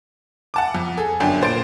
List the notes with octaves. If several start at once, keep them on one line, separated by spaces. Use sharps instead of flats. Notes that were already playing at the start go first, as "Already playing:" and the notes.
F#5 A5 D6
F2
G#4 A4
G1 F#2 D4 G5
A#2 C5 A6 D7